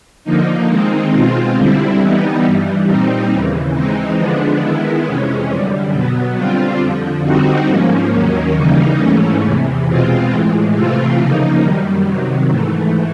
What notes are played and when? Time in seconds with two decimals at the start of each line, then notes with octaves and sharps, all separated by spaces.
0.24 D3 F3 A#3 D#4
0.68 D#3 G#3 C4 D#4
1.12 B2 G#3 C4 F4
1.55 D3 G3 C4 E4
1.99 E3 G3 B3 D#4
2.43 G2 E3 G3
2.86 A#2 G3 C4 D#4
3.30 D#2 C#3 E3
3.74 E3 G#3 C4 D#4
4.18 D3 F3 G#3 B3 D4
4.62 D#3 G#3 B3 E4
5.05 F2 C3 E3 G#3 C#4
5.49 F#2 D3 G3
5.93 B2 F#3 B3
6.37 D3 G3 C4 F4
6.80 F2 D3 F3
7.24 D3 G3 C4 D#4 F#4
7.68 G#2 F3 A#3 C#4
8.11 D#2 D#3 F#3 A#3 C#4
8.55 C#3 E3 G3 A#3 D#4
8.99 G#2 E3 A3 C#4
9.42 E2 C3 E3
9.86 B2 G#3 C4 F4
10.30 A2 E3 G#3
10.74 C3 E3 A3 C4 F4
11.18 C#3 F3 A#3 D#4
11.61 F#2 D#3 G3
12.05 C3 D#3 F#3
12.49 G#2 E3 A3